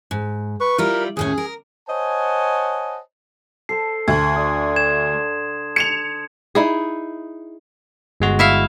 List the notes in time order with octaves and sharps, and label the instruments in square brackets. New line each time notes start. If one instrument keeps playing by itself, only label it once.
[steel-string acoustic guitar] G#2
[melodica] B4 C#6
[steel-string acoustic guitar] G3 E4 F4 [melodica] A#4
[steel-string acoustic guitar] D#2 A2 C#4 [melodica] G#4
[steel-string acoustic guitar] A#4
[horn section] C5 C#5 D#5 F#5 G#5 A5
[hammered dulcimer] A4 C5 A5 [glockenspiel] C7
[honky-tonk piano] D2 [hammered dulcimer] C5 [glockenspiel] C6 G#6
[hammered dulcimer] D3 [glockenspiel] D#6
[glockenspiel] G#6 E7
[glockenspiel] G#6 [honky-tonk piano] C#7 E7 F7
[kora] D#4 E4 G#4
[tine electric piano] G1 G#3 F#4
[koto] E4 E5 F5